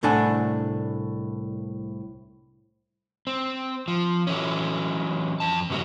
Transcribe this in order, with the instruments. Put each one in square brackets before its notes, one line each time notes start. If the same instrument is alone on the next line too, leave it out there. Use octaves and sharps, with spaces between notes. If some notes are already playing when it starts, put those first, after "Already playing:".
[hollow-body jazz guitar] C2 A2 A3 D4 F#5 G#5
[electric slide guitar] C4
F3
E3 F#3 C#4
F2 A5
G#2 C#3 F#3 G3 A#3